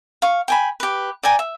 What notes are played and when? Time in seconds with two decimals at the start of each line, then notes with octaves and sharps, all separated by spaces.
0.22 F5 C#6
0.48 G5 G#5 B5
0.80 G4 B4
1.23 D5 G5 G#5 A#5
1.39 E5